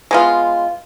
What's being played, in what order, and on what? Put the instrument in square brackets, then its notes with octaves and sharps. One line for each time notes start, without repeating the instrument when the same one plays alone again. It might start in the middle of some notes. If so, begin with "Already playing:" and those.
[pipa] G#3 B3 F4